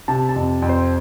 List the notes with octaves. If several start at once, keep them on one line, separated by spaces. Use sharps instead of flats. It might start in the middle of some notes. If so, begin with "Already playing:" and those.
C3 A5
A5
F2
F2
C5